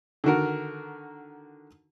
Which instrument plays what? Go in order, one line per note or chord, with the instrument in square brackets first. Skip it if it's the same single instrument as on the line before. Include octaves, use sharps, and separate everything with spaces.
[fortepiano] D3 D#3 F#4 A#4